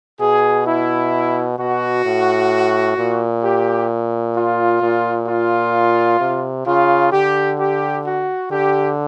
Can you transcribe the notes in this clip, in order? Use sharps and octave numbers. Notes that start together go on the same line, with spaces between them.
B2 G#4
E4
B2 F#4
A2
A#2
G4
F4
A#2
F4
C3
C#3 F4
D3 G4
G4
F#4
D3 G4